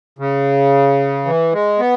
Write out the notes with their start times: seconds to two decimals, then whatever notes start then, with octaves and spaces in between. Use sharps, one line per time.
0.19 C#3
1.25 E3
1.53 G#3
1.79 B3